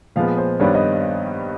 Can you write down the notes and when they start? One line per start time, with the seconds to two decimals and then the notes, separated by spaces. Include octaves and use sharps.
0.16 A#2 F3 G#3 B3 F5
0.38 C5
0.60 G2 D#3 G3 B3 D4 C#5
0.75 D#5